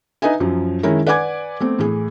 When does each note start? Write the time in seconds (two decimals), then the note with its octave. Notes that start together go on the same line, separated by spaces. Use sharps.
0.22 D#4 B4 D#5 E5 G#5
0.40 F#2 F3 F#3
0.83 D#3 G#3 C#4 E4 A#4
1.06 B4 D5 F#5 G#5 D6 G#6
1.60 A3 B3 C4
1.79 A2 E3 G#4